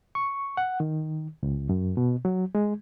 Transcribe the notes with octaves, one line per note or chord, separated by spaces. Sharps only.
C#6
F#5
D#3
C#2
F#2
B2
F#3
G#3